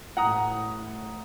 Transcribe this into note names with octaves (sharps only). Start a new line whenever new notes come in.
A1 A2 F#5 A#5 D#6